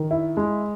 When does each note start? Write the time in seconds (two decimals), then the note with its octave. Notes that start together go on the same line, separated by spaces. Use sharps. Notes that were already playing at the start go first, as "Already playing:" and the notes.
Already playing: D#3
0.11 E4
0.37 G#3